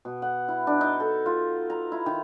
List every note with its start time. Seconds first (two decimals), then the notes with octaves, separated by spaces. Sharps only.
0.05 B2
0.22 F#5
0.48 E4
0.67 D4
0.81 D#4
1.00 A4
1.26 F4
1.70 A#5
1.92 E4
2.06 D#3